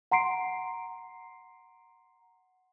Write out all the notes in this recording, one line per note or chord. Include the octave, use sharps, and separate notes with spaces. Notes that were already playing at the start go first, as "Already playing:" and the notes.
F#5 A#5 C6 C7 D7